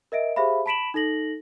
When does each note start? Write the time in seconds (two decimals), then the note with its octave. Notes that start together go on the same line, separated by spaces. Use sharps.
0.12 A#4 D#5 E5 D7
0.36 G4 G#4 C5 E5 F5 B5
0.66 A5 B5 B6 D7 E7 F#7
0.94 D#4 A4 A#6 F#7